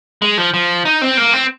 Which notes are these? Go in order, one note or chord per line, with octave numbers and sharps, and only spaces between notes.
G#3
F3
F3
D#4
C4
A#3
C4